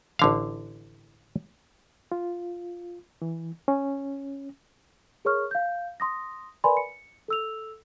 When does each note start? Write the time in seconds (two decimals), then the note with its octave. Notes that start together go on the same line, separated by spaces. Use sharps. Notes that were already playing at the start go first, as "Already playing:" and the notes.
0.19 A1 D3 F5
2.12 F4
3.22 E3
3.68 C#4
5.25 G#4 A#4 C#5 C#6 F6
5.51 F5 G6
6.00 C6 D#6 A#6
6.64 A#4 B4 D5 G#5 B5 C6
6.77 C#7
7.28 A4 E6 F7